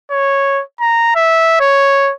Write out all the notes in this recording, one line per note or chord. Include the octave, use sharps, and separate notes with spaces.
C#5
A#5
E5
C#5